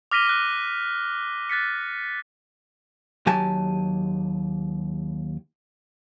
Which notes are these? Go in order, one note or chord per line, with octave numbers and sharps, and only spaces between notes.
D6 F6 A#6 B6 D#7 G7
D6 F#6 D#7
F#6 A6 B6 C#7
D#2 F#3 G4 G#5 A5